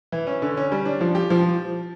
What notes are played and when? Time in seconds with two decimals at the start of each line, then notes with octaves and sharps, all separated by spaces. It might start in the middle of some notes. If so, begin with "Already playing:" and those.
0.12 E3
0.27 C#4
0.42 D3
0.57 C#4
0.72 G3
0.85 D4
1.01 F3
1.15 G4
1.30 F3